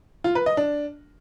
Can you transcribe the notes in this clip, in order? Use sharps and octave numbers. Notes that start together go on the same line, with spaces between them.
F4
B4
D#5
D4